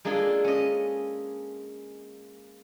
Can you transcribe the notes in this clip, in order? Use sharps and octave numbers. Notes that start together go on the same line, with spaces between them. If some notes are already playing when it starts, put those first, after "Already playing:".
G#3 A#3 D4 F4 G#4 A4
C#4 D#5